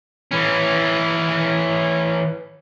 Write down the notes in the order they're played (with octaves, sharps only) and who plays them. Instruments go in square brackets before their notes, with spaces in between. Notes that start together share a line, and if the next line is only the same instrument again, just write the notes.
[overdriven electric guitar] E3 C#4